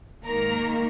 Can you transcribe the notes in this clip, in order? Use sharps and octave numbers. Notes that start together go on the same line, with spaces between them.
G#2 D#3 A#3 A#4 A#5